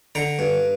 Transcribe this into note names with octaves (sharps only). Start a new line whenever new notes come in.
D3 G5 A#5
G2